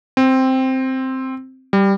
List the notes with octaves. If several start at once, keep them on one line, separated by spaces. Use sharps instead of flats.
C4
G3